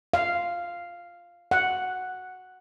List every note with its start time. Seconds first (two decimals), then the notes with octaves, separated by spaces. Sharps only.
0.14 F5
1.51 F#5